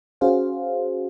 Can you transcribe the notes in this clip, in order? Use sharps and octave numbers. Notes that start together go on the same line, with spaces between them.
C#4 F#4 G#4 C5 F5